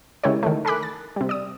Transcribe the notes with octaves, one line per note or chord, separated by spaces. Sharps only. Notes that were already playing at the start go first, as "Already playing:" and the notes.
C#3 G#3 E4 G4 A#4 C#5
D#3 E3 A3
A4 A#4 G#5 B5 D6 F#6
A6
C3 G3
D5 D#6